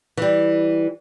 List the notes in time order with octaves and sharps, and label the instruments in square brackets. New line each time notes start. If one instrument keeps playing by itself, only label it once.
[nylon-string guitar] E3 G3